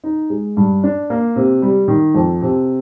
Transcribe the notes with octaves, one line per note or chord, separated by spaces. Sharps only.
D#4
G#3
G2
D4
A#3
C3
G3
D#3
F2
C3